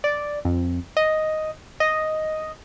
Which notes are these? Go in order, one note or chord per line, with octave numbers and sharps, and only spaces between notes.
D5
F2
D#5
D#5